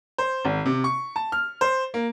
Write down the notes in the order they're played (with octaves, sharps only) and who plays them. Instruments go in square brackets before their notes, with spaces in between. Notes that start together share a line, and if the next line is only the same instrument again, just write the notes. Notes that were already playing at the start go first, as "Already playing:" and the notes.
[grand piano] C5
G#1
C3
C#6
A5
F6
C5
A#3